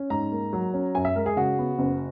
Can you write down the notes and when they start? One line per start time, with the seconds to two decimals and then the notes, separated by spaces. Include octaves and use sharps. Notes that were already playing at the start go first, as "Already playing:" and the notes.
Already playing: C#4
0.10 G#2 A#5
0.32 A#3
0.53 F#3
0.74 C#4
0.95 F#2 G#5
1.05 E5
1.15 G#3 A#4
1.26 G#4
1.36 C#3 F#4
1.59 B3
1.79 F#1